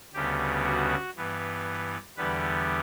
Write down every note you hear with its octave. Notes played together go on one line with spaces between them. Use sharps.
D2 C#3 G3 B3 G4
F#4
G2 E3 B3
E2 D3 G3 B3 B4